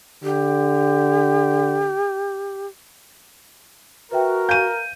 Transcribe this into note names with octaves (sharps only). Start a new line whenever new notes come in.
D3 G4
F#4 A#4 B4 E5 G5
F5 G#5 G6 D#7